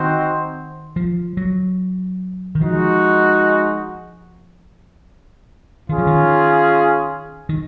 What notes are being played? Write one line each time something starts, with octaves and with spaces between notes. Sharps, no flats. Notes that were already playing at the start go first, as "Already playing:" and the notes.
Already playing: D#3 C4 D#4 F#4 C5
F3
F#3
D#3
F3 G#3 D#4 F#4
D#3 C#4 F4 G#4
F3
D#3
D#3